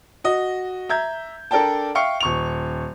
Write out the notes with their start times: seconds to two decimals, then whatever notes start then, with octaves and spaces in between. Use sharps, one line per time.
0.24 F#4 D#5
0.89 E5 A#5 G6 G#6
1.51 D4 A4 A#4 D5 G5 A5
1.95 E5 F5 G5 C#6 C#7
2.21 D#1 C#6 F7